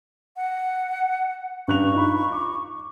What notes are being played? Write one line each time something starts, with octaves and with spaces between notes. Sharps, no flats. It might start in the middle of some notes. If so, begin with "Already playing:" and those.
F#5
G2 C#6 F#6 F7
D#4 F4 B5
D6